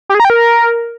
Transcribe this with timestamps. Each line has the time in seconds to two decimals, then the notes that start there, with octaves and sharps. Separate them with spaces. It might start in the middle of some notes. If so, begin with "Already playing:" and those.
0.09 G4
0.15 G#4
0.20 A#5
0.25 G5
0.30 A#4